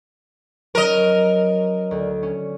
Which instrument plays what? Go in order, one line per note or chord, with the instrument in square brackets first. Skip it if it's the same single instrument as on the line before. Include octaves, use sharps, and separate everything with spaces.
[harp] F#3 C#4 [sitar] A#4 D#5
[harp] D2
C#4